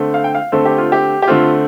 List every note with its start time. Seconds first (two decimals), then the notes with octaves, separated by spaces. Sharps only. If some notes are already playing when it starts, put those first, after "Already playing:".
Already playing: D3 A3 C4
0.14 F5
0.24 G5
0.35 F5
0.52 D3 A3 C4 A4
0.66 G4
0.78 F4
0.92 G4
1.22 G4
1.28 D3 A3 C4 F4